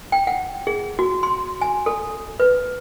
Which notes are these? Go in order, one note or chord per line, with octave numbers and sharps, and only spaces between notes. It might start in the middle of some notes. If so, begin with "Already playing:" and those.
G5
F#5
G#4
F#4
C6
G#5
A4
B4